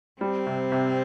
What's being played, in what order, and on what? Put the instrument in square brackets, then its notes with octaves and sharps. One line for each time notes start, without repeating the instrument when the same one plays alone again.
[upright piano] G3 [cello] C4
[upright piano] C3
C3